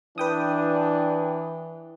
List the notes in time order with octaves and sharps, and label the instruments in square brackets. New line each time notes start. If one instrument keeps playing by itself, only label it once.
[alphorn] E3 [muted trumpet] D4 [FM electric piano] B4 G5 D#6